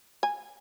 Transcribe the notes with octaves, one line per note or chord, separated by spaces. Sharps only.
G#5